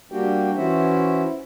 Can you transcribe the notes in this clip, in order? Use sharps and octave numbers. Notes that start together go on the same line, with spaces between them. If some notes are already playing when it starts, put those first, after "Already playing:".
G3 A#3 D4 F#4 G4 G5
E3 C#4 E4 F#4 C5 E5